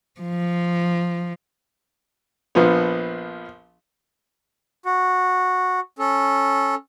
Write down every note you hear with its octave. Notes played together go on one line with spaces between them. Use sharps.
F3
A#1 F3 B3
F#4
C#4 A4